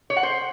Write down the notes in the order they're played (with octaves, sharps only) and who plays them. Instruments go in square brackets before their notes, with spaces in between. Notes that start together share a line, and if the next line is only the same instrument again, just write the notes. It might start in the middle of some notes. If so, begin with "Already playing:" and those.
[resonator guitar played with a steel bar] C#5
F#5
C5